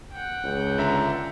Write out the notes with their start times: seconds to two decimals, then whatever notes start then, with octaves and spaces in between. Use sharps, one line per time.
0.12 F#5 G5
0.44 C#2
0.78 D3 E5 A#5